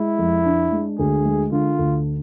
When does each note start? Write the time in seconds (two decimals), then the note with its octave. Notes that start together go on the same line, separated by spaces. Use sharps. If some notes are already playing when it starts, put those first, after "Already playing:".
Already playing: G#3 E4
0.19 F2
0.45 D4
0.72 G#3
0.99 D2 G#4
1.25 G#3
1.52 D3 F4
1.79 D2